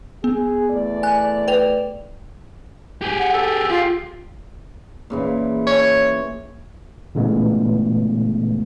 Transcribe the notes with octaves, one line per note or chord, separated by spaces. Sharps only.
B3 G#4
E2 A3 D5
G#5 F#6
B4 G5 F7
G4 G#4
F#5
A4
F4
A#2 C#3 E3
C#5
A#2 C#3 E3 G#3 A3 B3